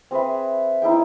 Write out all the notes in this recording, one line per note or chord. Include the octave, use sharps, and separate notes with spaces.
C4 G#4 B4 E5
D#4 E4 G#4 G5